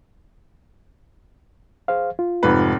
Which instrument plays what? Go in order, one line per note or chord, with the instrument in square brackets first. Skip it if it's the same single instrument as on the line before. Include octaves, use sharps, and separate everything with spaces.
[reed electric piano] G#4 C5 F5
F4
[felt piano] F1 G#2 B4